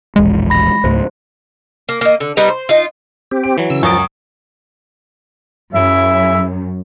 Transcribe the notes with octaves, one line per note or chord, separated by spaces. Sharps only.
E1 A#1 E2 G#3
B5 A#6
C#2 G#2 A3 C5
A#3
A#3 D#5
D3
G3 B3 D#4 A#4
C5
D#4 F4
C4 G4
D7
E3 F#3
C#3 E6
C#2 F#2 F3 C#6 D#6 A6 D7
F#2 C#3 E4 E5